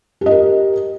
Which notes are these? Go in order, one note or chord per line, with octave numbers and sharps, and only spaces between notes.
G4 A#4 D#5